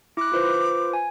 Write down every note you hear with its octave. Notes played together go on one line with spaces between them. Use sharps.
E4 D6 F#6
F4 B4 C5
G#5